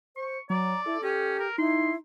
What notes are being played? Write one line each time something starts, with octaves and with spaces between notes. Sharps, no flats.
C5 C#6
F#3 D5 A#5
E4 A4
C#4 G4
A#4
D#4 E4 C6